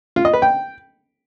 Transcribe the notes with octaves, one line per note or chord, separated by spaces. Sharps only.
F4
D#5
B4
G5